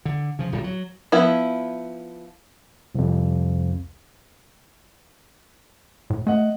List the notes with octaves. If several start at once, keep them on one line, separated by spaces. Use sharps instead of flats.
D3
C#3 F3
D1 A#2 G3
F#3
F3 B3 E4
C2 F2
A2
A3 D#5 F#5